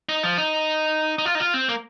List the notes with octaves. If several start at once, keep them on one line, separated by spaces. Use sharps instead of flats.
D#4
F3
D#4
D#4
F4
D#4
F4
C4
A#3